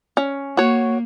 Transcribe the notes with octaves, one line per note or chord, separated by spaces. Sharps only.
C#4
A#3 F#4 C#5